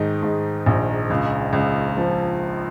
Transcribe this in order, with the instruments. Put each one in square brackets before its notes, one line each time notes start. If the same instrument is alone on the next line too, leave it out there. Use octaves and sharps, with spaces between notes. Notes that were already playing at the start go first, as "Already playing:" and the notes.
Already playing: [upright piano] G#2 D#3 D#4
G#2
A#1
C#2
C#2
F3